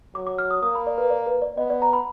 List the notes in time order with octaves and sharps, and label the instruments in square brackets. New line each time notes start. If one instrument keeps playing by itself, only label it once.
[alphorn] F#3 [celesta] D6
[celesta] D6
F6
D#6
[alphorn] A#3 [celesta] D#6
[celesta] B5
D5
B4
D5
B4
D5
[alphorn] B3 [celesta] D#5
[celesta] D5
A#5
B5